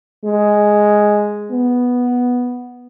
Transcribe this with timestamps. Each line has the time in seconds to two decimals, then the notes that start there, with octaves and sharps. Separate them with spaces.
0.25 G#3
1.51 B3